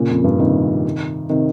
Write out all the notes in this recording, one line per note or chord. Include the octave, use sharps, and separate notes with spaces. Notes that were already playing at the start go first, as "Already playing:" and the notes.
Already playing: A#2 C#3
F2
G2
C3 D#3
C3 D#3